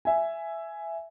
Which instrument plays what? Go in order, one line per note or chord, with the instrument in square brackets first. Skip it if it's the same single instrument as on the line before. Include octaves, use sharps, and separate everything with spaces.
[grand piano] E5 G#5